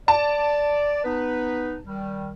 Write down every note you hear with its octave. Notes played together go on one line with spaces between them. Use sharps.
D5 A5
B3 D#4 B4
D#3 G3